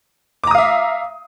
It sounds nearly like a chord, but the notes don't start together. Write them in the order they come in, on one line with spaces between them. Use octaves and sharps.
D6 A#5 D#6 F5 E5